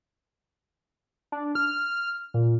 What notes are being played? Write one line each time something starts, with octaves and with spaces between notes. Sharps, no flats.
D4
F6
A#2